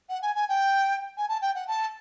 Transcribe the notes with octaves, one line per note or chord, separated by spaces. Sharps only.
F#5
G#5
G#5
G5
G#5
A5
G5
F#5
A5